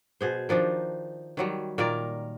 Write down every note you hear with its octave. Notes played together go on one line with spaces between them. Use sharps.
B2 G#4 C5
D#3 F3 D4 D#4
D#3 F#3 G3
A#2 D#3 A#4 D5